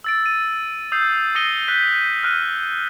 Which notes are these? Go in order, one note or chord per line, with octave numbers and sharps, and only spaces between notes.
E6 A6 D7
D#7
D#6 E6 G6 C7
D#6 A#6 C#7 D#7 G7
F#6 G6 B6 D#7
F6 F#6 D#7